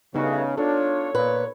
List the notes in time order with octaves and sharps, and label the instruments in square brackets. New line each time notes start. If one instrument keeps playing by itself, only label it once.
[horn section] G2 A3 F#4 [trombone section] C#3 [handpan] B3 D#4
[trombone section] D4 F4 [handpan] A4 [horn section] C#5
[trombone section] A#2 [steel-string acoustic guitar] B4